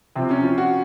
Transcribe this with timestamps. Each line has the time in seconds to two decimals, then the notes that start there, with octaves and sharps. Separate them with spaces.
0.15 C3 F3 C4
0.31 C#4
0.44 F4
0.58 F#4